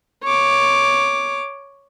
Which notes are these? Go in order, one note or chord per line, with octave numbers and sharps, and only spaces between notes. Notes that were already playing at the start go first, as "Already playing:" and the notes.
C#5 D6